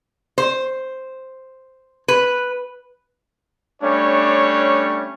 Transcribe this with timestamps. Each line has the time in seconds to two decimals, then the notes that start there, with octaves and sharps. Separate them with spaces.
0.38 C5
2.08 B4
3.82 G3 A3 C#4 D4 C#5